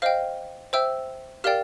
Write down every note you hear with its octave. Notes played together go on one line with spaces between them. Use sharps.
C5 D#5 F5 G5 F6
C5 E5 G5 E6
G4 A#4 D5 F5 G5 F6